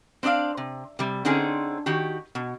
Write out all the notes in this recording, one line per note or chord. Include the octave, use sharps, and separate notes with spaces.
C4 D4 D5 D#5 F5
C3
C3 G3
D3 C4 C#4 D#4 G#4 C5
D#3 F#4 G4
B2